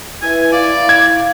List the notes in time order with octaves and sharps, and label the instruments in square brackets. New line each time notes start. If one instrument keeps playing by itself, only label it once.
[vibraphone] E4 B4 E5 [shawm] G#5
[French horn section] E4 [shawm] D5 [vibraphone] F5
[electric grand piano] G#6